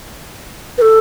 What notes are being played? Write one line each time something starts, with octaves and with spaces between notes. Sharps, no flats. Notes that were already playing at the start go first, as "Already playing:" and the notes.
B4
A4